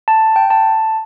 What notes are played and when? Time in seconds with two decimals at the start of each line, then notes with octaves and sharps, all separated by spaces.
0.08 A5
0.36 G5
0.50 A5